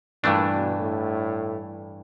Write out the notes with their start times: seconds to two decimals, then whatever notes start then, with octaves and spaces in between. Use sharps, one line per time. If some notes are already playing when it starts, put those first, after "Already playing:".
0.23 G2 A#2 E3 A3 D4
0.52 B2
0.80 A2